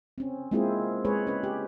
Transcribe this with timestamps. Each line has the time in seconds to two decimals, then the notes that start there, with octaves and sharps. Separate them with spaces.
0.18 C4 C#4
0.51 G#3 A#3 C4 E4 F4 G#4
1.05 G#3 G#4 B4 C#5
1.27 C#4 B4
1.44 G4